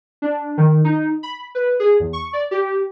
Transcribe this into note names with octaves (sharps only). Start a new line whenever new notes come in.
D4
D#3
D#4
B5
B4
G#4
E2
C#6
D5
G4